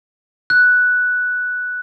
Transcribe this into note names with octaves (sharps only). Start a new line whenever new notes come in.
F#6